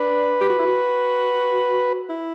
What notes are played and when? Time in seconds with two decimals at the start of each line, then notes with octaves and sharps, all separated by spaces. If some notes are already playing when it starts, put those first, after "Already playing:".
Already playing: D4 B4
0.41 G4
0.50 F#4
0.59 E4
0.66 F#4
2.09 E4